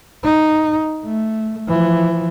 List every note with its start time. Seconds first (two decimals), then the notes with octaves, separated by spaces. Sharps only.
0.23 D#4
1.04 A3
1.67 E3 F3